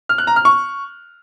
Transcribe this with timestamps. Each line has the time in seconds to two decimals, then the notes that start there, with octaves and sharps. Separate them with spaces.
0.09 F6
0.18 F#6
0.27 A#5
0.36 F6
0.45 C#6